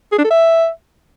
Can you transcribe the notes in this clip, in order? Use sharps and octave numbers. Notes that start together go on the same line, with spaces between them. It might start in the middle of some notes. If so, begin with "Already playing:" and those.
G#4
D4
A4
E5